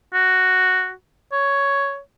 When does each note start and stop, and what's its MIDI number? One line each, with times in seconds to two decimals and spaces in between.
0.14 0.92 66
1.32 1.99 73